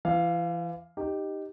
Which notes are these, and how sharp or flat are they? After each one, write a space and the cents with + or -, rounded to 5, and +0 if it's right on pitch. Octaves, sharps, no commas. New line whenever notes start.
E3 +35 F5 +0
D#4 -10 G4 +0